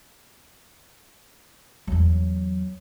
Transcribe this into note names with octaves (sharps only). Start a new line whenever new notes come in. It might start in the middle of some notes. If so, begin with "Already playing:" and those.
E2 F#3